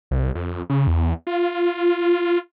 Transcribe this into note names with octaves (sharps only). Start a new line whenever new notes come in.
C2
F2
C#3
E2
F4